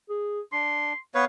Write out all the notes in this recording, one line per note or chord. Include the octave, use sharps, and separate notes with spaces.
G#4
D4 C6
B3 B4 C#5 F5